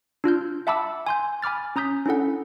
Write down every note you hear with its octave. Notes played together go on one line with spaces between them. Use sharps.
D4 F4 F6 G6
E5 F#5 A5 B5 D6 E6
G#5 C6 G6
G#5 B5 D6 F6 A6
C#4 A#5 D#6 G6 B6
C#4 D4 E4 A4 F#5